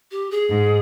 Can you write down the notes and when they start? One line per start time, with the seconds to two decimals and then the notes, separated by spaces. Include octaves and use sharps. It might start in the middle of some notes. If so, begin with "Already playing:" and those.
0.12 G4
0.31 G#4
0.49 G#2